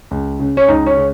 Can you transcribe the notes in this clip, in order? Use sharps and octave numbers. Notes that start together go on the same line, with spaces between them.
C#2
C#3
C#4
C#2 D#4
C#4
C#3